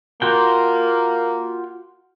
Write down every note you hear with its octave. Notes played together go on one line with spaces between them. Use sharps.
A#3 F4 F#4 G5